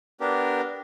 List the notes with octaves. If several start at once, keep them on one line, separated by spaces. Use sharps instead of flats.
B3 D4 G4 A#4